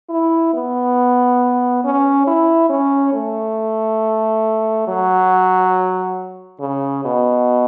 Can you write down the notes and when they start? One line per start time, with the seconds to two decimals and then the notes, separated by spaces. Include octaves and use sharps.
0.09 E4
0.54 B3
1.84 C#4
2.27 E4
2.69 C#4
3.14 A3
4.88 F#3
6.60 C#3
7.04 B2